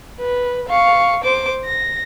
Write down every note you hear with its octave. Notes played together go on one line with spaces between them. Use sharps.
B4
F5 C#6
C5 D6
A#6